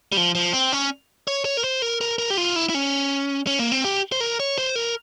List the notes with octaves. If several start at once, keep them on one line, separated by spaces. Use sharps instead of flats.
G3
F3
F3
C4
C#4
C#5
C#5
A#4
C5
A#4
A#4
A#4
G4
F4
E4
E4
C#4
C#4
A#3
C4
G4
C5
A#4
C#5
C5
A#4